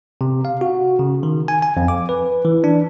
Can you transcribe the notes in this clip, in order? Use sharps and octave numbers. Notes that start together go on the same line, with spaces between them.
C3
F5
F#4
C#3
D#3
G#5
G#5
F2
D6
B4
E3
D4